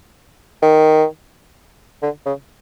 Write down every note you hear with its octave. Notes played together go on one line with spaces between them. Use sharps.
D#3
D3
C#3